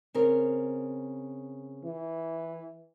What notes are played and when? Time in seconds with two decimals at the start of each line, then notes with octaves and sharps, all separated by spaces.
0.14 C#3 C4 A#4
1.84 E3